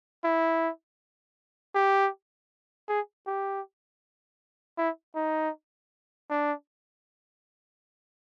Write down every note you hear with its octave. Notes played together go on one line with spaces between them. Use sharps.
E4
G4
G#4
G4
E4
D#4
D4